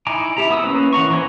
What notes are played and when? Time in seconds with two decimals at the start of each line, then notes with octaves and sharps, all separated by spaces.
0.07 D#4 E4 G#5 A#5 D6
0.37 E4 G4 A#5
0.50 B3 D#6 E6
0.64 A#3 C#4 B4
0.93 E3 F#5 A#5 C#6
1.10 E3 B3 C5 G#5 A#5